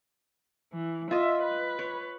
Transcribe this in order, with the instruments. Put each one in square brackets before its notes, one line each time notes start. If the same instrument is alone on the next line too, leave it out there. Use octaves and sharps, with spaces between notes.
[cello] E3
[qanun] F4 D#5 [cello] E5
[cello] B4
[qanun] C#5